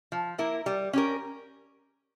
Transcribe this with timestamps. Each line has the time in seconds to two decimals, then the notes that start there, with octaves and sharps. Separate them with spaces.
0.12 F3
0.38 A#3 E4 A#4
0.66 G3
0.93 C#4 G4 A#4